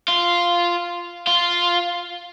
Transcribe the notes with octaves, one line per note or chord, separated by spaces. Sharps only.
F4
F4